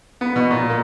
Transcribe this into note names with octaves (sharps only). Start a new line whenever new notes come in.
B3
B2
A#2
A#3